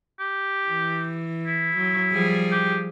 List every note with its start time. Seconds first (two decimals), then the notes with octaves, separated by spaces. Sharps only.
0.20 G4
0.67 E3
1.47 E4
1.77 F#3
2.12 F3 G3 G#4
2.52 G4